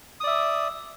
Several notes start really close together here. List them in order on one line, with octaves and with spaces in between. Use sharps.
D#6 D5 E5